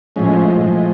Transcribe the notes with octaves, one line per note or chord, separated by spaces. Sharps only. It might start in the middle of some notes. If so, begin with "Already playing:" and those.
A2 F3 G#3 C#4
A2 F3 G#3